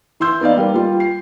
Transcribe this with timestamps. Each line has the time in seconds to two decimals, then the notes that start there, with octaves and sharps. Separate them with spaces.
0.20 E3 C6 E6 G6
0.41 B3 D#4 D5 F5
0.57 G3 A#3 B4
0.74 G3 F4
1.00 C7